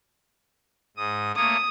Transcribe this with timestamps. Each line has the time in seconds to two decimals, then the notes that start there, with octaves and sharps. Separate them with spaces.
0.97 G#2 D#6
1.36 A3 A#3 C#5 D#6